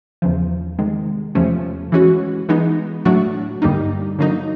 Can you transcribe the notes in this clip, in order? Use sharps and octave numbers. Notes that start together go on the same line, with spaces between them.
E2 C#3 F3
C3 D#3 G#3
E2 C3 F3 A3 C#4
E3 G#3 C#4 F#4
E3 G#3 B3 D#4
A2 F#3 A3 D4 F#4
G2 D3 G3 A#3 D#4
D3 F#3 A#3 D#4